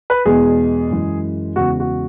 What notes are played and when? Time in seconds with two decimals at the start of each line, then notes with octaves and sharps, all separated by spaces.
0.10 B4
0.25 E2 B2 G#3 G#4
0.90 F#2 E3 G#3
1.56 E2 C#3 G#3 F#4
1.80 F#4